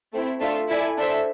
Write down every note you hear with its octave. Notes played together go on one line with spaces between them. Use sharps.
A3 C4 E4
A3 D4 F4 A4 E5
E4 A4 D5 G#5
D4 A4 C5 E5